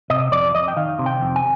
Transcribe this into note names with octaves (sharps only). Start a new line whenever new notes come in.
C3 D#5
F2 D5
F2 D#5
G5
D#3 F5
C3
G5
F2
G#5